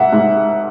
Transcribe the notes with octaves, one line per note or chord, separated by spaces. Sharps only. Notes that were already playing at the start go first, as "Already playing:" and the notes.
Already playing: G#2 E5 F#5
G#2